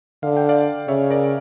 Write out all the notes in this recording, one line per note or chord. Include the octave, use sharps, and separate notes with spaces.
D3 F5
G5
D5 F5
C#3 C#5 E5
A#4 D5